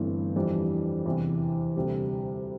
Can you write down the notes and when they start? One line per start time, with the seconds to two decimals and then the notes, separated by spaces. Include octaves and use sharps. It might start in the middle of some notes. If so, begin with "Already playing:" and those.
Already playing: G1 G2 E3 A3 C4
0.36 F2 E3 G3 D4
1.05 E2 C3 E3
1.76 D2 C3 G3